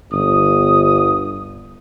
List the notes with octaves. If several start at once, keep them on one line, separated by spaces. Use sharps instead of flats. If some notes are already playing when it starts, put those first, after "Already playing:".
G1 D#6